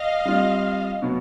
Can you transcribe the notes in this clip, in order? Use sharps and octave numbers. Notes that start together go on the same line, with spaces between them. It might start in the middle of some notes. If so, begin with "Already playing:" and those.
Already playing: D#5 F5
G3 C4 F4
B2 F#3 B3